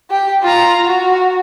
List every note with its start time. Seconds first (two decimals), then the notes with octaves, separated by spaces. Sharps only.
0.10 G4 G5
0.43 F4 A#5
0.85 F#4